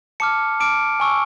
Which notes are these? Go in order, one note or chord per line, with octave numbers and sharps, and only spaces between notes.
A5 D6 F6 C#7
A5 D6 F6 D7
G#5 C#6 E6